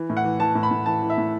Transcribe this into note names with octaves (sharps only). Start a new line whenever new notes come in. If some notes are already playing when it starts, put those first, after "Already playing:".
Already playing: E3
A2
F#5
E3
E3 A5
A2
B5
A2
E3 A5
E3
E5
A2